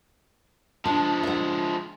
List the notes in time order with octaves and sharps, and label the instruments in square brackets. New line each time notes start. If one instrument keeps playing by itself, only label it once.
[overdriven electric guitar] F3 G#3 [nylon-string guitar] D4
[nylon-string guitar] E5 F#5